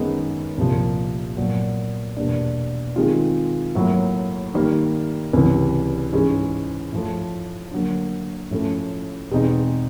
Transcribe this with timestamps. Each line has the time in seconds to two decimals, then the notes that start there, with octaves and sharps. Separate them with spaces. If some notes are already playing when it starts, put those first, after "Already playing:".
Already playing: F#2 D#3 G#3 B3 D#4
0.58 C2 A#2 F3 A#3
1.37 A#2 F#3 B3
2.17 E2 B2 G3 A#3 D4
2.96 D#3 G#3 C4 F4
3.75 A2 F#3 A#3
4.54 D#3 G3 A#3
5.33 C#2 C3 E3 G3
6.13 G#2 E3 G#3 C#4
6.92 A2 F3 A3
7.71 D3 F#3 A#3
8.51 A2 F3 A3 C#4
9.31 E2 B2 G#3 C4 D#4